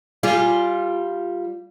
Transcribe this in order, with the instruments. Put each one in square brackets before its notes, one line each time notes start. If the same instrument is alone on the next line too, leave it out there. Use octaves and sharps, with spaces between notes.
[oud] G3 F4 G#4